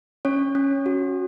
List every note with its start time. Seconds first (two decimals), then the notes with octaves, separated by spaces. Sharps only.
0.25 C#4 C#5
0.55 C#4
0.86 F#4